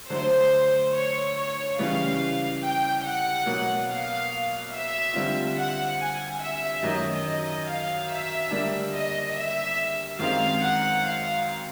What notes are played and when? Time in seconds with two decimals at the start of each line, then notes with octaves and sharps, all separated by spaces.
0.10 D3 F#3 A3 C5
0.94 C#5
1.37 C#5
1.79 C#3 E3 G3 F5
2.62 G5
3.04 F#5
3.46 B2 F#3 A#3
3.88 F5
4.72 E5
5.14 D3 G3 C4 F4
5.57 F#5
5.99 G#5
6.40 E5
6.82 F#2 D#3 F#3 D#5
7.25 D#5
7.66 F5
8.08 E5
8.51 D3 G3 A#3 D4
8.93 D#5
9.34 E5
10.18 F#2 D#3 G#3 C4 F5
10.60 F#5
11.02 F5